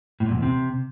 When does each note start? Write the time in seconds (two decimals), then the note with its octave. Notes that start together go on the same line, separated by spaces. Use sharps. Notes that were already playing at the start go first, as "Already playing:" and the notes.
0.20 A2
0.26 A#2
0.31 F#2
0.37 E2
0.42 C3